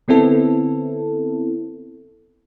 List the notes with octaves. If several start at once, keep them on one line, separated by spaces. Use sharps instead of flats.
D3 B3 C4 E4 A4